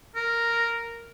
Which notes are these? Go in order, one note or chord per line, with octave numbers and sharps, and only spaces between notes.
A#4